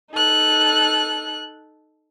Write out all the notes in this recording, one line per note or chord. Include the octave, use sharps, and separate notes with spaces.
D#4 A4 F#6